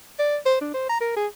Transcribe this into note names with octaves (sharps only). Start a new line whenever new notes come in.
D5
C5
D4
C5
A#5
A#4
G#4